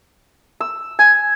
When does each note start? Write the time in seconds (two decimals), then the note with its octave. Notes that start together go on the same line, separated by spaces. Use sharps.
0.60 E6
0.99 G#5